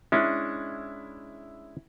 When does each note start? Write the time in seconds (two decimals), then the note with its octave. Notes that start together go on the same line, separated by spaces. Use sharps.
0.12 G#3 C#4 D4 E4